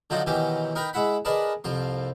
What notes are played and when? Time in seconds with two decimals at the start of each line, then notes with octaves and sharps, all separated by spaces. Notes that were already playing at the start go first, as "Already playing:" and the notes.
0.10 D3 F3 F#3 D#4 F4 F#4
0.26 B2 D#3 E3 F#3 C#4 G4
0.75 D#4 A#4 B4 G5 A#5
0.93 G#3 E4 F#5 B5
1.25 G#4 A#4 B4 D5 D#5 A5
1.64 C2 F2 F3 C6